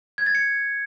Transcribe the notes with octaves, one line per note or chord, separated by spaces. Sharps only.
G#6
A6
C#7